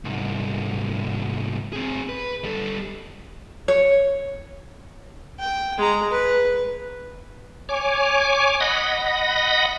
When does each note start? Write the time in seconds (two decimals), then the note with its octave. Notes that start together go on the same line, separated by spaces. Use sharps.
0.05 C2 G#2
1.73 C4 G#4
2.09 B4
2.44 G3 A4
3.68 C#5
5.39 G5
5.78 G#3 A#5
6.11 B4
7.69 C#5 G#5 D6
8.60 D#5 F#5 B5 A#6